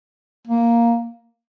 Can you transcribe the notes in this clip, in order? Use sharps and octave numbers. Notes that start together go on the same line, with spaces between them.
A#3